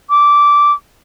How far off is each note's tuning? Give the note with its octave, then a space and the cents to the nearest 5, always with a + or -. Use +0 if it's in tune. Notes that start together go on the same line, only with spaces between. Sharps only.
D6 -10